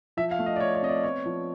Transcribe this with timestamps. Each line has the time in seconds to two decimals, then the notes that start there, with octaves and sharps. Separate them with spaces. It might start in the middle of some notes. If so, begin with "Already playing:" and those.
0.17 F3 E5
0.31 F5
0.39 A3
0.46 D#5
0.56 D5
0.60 A3 C#5
0.75 C#5
0.82 C4 D#5
0.89 D5
1.03 B3 C#5
1.25 F3